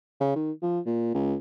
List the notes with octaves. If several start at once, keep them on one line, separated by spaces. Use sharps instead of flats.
C#3
D#3
F3
A#2
C#2